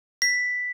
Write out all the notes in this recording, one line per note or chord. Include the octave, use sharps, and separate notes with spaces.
B6